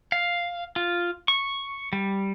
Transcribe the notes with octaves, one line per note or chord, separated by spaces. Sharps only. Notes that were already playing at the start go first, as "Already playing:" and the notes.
F5
F4
C#6
G3